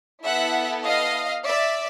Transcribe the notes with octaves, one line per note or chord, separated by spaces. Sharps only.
B3 E4 A4 E5 F#5
D#5 F5
D5 E5